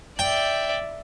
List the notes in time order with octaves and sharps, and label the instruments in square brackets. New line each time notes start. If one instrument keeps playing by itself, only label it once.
[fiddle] D5 E5 [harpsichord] G5